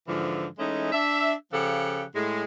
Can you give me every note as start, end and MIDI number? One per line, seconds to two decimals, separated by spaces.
0.08 0.47 44
0.08 0.47 50
0.08 0.47 52
0.08 0.47 53
0.59 0.91 52
0.59 0.91 56
0.59 0.91 57
0.59 0.91 61
0.59 0.91 63
0.92 1.33 62
0.92 1.33 76
1.53 2.03 49
1.53 2.03 53
1.53 2.03 67
1.53 2.03 69
1.53 2.03 78
2.15 2.44 45
2.15 2.44 56